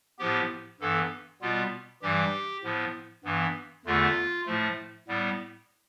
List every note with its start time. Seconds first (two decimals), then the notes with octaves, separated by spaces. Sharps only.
0.19 A2 F3 B3 G4
0.80 G2 E3 B3 A4
1.42 B2 G3 B3 F4
2.02 G2 E3 G3 G4
2.63 A2 F3 B3
3.24 G2 E3 B3
3.85 E2 D3 A3 F4
4.46 A2 F3 A3
5.08 A2 G3 B3